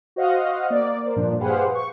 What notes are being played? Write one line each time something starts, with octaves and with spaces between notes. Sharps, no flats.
F#4 C5 D#5 F5 F#5
A#3 D5
A#4 C5
G2 A#2 F3 D4
G4 G#4 B4 C5 F5 F#5
C#6